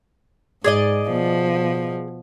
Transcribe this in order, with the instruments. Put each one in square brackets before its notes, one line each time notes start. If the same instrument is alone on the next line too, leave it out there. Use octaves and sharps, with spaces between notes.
[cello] G#2 [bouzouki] G#4 D5 D#5
[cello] B2 F3